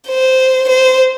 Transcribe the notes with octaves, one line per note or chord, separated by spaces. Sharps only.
C5
C5